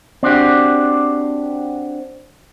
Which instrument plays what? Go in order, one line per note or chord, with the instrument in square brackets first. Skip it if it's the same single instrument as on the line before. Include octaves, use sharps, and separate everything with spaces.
[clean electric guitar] C4 D4 F#4 G4